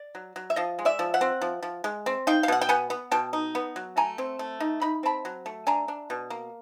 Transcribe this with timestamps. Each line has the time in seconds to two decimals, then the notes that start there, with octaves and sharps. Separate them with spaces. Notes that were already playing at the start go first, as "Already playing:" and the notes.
Already playing: D5
0.15 F#3
0.36 F#3
0.50 E5
0.56 F3 D#5 F5
0.79 G#3
0.85 D5 E5
0.99 F3
1.14 E5 F#5
1.21 C4
1.41 F3
1.63 F3
1.84 G#3
2.06 C4
2.27 D#4 F5 G5
2.43 F5
2.48 B2 F#5
2.61 G5
2.69 B3 F#5 G#5
2.90 B3
3.11 B2 G5 A5
3.33 D#4
3.55 B3
3.76 F#3
3.97 A3 G#5 A#5
4.18 C4
4.39 A3
4.60 D#4
4.81 D#4 B5
5.03 C4 A5 B5
5.25 F#3
5.46 A3
5.67 D4 G#5 A#5
5.88 D4
6.10 B2
6.30 A#3